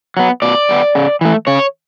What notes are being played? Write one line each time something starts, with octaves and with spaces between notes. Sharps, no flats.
F#3 B3
B2 D5
G3 B3
C#3
E3 A3
C#3 C#5